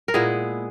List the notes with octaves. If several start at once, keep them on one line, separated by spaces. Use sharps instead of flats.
A#4
A#2 G#3 B3 E4 G#4